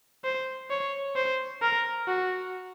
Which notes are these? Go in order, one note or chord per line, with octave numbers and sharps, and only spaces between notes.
C5
C#5
C5
A#4
F#4